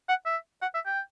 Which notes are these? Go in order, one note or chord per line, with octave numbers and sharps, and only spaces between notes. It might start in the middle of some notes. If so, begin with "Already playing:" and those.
F#5
E5
F#5
E5
G5